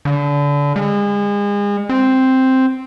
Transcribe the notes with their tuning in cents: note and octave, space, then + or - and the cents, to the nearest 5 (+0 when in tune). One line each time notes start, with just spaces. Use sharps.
D3 -30
G#3 -35
C4 +0